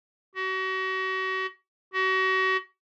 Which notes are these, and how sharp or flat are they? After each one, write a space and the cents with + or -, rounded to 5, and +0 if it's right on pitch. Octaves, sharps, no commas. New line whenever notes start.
F#4 +35
F#4 +35